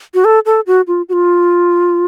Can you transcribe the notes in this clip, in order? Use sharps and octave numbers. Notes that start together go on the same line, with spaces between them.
F#4
A4
A4
F#4
F4
F#4
F4